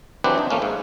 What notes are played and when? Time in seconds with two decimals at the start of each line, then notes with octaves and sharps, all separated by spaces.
0.24 E3 F#3 C4 D4 G4 B4
0.38 D4 D#4
0.50 F3 A3 A#3 C#4
0.62 G#2